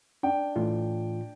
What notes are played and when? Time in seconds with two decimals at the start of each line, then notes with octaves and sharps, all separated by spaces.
0.23 D4 G5
0.56 A2 E3 F4